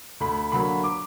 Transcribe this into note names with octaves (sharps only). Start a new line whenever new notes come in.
D2 B5
D3 F#3 A#3 B5
D6